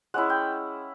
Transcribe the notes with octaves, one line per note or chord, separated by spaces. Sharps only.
G#3 C#4 E4 F#5
G5